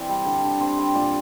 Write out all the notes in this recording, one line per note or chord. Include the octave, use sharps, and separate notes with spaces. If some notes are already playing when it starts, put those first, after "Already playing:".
Already playing: E3 C4 D5
G3
D3
D3
C4 C5
G3
A#2 D5